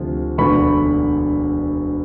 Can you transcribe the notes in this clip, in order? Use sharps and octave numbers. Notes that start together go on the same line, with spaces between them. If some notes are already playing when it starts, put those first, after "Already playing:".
Already playing: D2 C3 F3
E1 D2 D3 B5 C#6